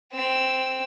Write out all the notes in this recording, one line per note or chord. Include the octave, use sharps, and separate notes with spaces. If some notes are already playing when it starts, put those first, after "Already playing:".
C4 E6